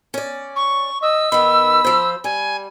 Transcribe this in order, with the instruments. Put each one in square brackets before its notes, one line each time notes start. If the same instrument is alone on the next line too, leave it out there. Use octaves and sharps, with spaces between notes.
[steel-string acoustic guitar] C#4 D5
[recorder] C#6
[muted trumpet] D#5 [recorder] E6
[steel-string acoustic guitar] D#3 B3 [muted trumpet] B5
[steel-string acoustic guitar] F3 C5
[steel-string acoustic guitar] G3 [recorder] G#5